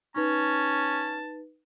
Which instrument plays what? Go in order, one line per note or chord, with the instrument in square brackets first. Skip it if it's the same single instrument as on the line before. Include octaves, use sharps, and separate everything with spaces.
[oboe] C#4 [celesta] D#4 B4 [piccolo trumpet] A5